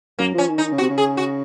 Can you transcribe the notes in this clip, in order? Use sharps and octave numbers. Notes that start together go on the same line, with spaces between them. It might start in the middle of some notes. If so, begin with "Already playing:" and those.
F#2 A#3
F3 C#4
D#3
D#4
D#3
C#3
F#4
C3
C#3
G#4
F#4